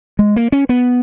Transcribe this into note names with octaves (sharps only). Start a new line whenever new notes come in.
G#3
A#3
C#4
B3